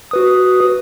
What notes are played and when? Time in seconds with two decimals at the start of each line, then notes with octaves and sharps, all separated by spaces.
0.11 F#4 B4 D#6